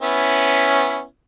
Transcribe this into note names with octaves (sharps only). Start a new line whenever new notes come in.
B3 C#4 E4